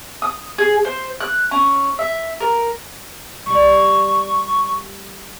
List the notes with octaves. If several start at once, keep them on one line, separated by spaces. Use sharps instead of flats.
D#6
G#4
C5
F#6
C#4
E5
A#4
G3 D5 C#6